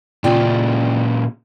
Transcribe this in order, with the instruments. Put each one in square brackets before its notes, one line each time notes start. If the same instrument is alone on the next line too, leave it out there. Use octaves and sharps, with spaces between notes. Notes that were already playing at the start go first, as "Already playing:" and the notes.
[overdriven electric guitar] A#2 C#3 [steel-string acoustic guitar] F4 D5 G5